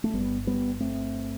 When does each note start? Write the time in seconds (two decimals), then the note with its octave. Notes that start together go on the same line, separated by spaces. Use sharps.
0.04 A3
0.14 G1 G2 G3 B3
0.47 G3 B3
0.80 A3 C4